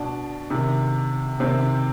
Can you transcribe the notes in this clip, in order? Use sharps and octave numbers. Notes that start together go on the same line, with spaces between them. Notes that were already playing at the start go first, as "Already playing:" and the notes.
Already playing: B2 D4
C3 D#3
C3 D#3 C4